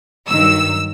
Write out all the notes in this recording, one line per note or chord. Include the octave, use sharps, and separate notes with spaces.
G2 D#3 F#3 E6